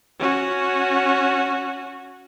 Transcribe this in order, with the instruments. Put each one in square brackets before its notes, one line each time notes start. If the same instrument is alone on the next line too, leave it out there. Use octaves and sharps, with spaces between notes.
[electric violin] C#4 F#4